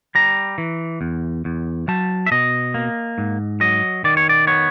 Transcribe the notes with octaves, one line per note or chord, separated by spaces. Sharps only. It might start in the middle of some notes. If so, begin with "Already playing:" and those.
G3 A#5
E3
E2
E2
F#3 A5
E5
B2 D#5
A#3
G#2
F#3 D#5
D#3 D5
C#5
D5
B3 C#5